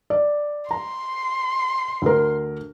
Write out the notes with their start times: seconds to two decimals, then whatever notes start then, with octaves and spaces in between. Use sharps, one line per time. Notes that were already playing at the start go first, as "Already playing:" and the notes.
0.10 D5
0.71 A#5 C6
2.02 D2 A#4